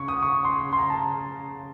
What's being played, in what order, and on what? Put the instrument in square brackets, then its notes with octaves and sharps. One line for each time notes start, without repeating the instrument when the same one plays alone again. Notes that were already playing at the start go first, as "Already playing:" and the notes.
Already playing: [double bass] C#3 [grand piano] C#6
[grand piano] D#6
C#6
C6
C6
A#5
A5